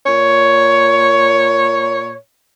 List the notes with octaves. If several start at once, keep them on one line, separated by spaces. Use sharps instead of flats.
A#2 C#5